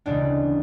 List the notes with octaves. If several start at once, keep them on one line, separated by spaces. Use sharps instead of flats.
E1 D2 C#3 G#3 C#4 D4 D5